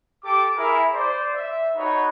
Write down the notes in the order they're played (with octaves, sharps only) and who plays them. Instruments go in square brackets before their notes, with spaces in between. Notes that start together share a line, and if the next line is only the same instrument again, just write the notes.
[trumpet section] G4 A4 D6
E4 G#4 A#4 E5
C5 D5
E5
D#4 F#4 B4 C#5 F#5